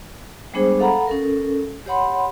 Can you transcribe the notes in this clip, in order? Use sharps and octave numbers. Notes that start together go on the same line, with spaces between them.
G3 G#3 B3 D4 G#4 C5
A4 F5 F#5 A#5 B5
C#4 A4 A#4
G4 C#5 F#5 B5 C6